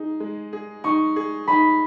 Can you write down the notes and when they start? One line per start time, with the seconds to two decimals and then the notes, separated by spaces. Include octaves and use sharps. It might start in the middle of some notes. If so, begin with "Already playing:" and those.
Already playing: D#4 G#4
0.20 G#3
0.53 G#4
0.84 D#4 C#6
1.16 G#4
1.48 D#4 B5